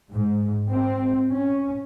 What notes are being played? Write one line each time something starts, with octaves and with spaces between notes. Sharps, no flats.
G#2
C4
C#4